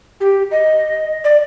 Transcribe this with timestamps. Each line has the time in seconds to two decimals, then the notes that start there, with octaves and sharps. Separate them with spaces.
0.20 G4
0.51 D#5
1.24 D5